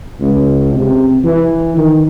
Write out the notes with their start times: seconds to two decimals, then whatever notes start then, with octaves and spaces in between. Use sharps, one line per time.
0.20 C#2
0.75 C3
1.24 E3
1.77 D#3